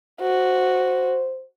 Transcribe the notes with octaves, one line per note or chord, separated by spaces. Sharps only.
F#4 C5